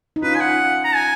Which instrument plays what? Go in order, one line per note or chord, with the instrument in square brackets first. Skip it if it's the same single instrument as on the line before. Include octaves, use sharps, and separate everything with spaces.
[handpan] D#4
[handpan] C#4 F4 [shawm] B4
[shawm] G#5
F#5
A#5
G#5